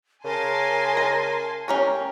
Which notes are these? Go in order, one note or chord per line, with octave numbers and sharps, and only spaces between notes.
C#3 A#4 G#5 A5 C6
A#5
C#4 G4 A#4 C#5